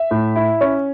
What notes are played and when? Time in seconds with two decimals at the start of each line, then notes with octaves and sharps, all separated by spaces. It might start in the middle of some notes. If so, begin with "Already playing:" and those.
Already playing: E5
0.11 A2
0.36 E4
0.61 C#4